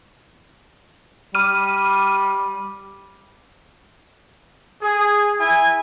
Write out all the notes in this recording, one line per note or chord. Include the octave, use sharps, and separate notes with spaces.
G3 D6 F6 D#7
G#4
E4 G#5